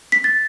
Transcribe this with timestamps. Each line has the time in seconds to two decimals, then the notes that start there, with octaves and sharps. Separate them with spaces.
0.12 B6
0.24 A6